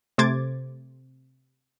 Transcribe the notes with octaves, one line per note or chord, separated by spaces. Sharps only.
C3 A3 C5 D6 G#6 A6